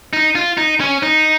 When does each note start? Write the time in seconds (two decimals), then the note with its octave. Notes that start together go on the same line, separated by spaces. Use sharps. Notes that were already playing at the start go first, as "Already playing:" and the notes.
0.13 D#4
0.35 F4
0.57 D#4
0.80 C#4
1.03 D#4